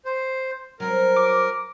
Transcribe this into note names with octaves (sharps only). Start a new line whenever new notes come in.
C5
F#3 C4 A#4
D6